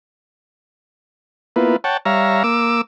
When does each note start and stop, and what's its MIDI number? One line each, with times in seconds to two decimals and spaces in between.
1.56 1.76 58
1.56 1.76 59
1.56 1.76 64
1.56 1.76 65
1.56 1.76 71
1.84 1.97 73
1.84 1.97 78
1.84 1.97 79
1.84 1.97 81
2.05 2.43 55
2.05 2.43 73
2.05 2.43 76
2.05 2.43 77
2.05 2.43 82
2.44 2.81 58
2.44 2.81 86
2.44 2.81 88